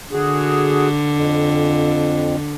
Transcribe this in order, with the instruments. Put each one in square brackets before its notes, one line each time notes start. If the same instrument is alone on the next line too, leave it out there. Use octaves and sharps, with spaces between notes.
[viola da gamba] D3 [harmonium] F#4 G#4
[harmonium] F2